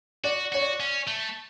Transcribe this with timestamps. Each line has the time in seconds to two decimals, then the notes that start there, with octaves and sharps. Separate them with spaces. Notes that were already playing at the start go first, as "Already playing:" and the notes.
0.24 F#4 D5
0.52 F#4 C#5
0.61 D5
0.80 C#4
1.07 A3